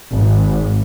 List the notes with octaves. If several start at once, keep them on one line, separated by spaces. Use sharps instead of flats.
G#1